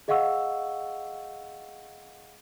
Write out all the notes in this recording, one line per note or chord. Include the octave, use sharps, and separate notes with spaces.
G#4 D#5 F5 F#5 C#6 E6